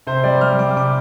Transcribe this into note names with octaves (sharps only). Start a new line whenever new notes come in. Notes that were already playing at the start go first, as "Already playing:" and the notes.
C3 C5
G3 D5
G3 F6
G3 D6
C3 D6